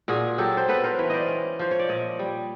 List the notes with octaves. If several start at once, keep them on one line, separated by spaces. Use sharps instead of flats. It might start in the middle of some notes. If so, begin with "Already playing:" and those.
A#2 F#4 G#4
F#3 G4 A4
C5
B3 A4 B4
A#4 C5
E3 B4 C#5
C5 D5 D#5
C#4
F3 C5
C#5
D5
A#2 C#5 D#5
G3